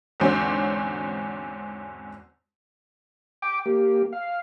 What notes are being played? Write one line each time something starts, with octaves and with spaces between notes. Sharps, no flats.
E2 G#2 D3 F#3 C4 C#4
G5 D6
A#3 G4
F5